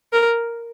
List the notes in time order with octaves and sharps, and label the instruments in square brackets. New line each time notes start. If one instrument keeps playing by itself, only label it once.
[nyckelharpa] A#4